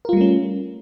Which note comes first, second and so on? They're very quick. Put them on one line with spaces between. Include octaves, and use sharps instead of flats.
A#4 F4 G3 A3 C#4